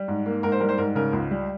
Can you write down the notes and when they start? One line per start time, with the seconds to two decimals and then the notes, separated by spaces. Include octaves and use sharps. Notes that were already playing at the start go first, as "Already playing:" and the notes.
Already playing: G3
0.08 G#2
0.26 A#3
0.43 G#2 A#4
0.52 C5
0.60 G3 A#4
0.69 C5
0.78 G#2 A#4
0.95 C#3 A#4
1.13 C#2
1.31 G3